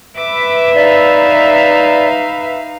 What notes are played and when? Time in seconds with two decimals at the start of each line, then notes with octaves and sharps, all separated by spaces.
0.17 B4 E5 D6
0.75 D#4 D5 F5